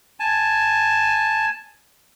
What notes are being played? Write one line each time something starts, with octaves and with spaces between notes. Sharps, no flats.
G#5 A5